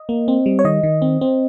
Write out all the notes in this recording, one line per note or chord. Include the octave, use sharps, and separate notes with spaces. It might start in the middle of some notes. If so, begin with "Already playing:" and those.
Already playing: D#5
A#3
C4
G3
C#5
D#3 D#5
D#3
C4
C4